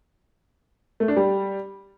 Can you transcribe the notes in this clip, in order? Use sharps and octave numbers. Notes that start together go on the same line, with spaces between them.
A3
D4
G3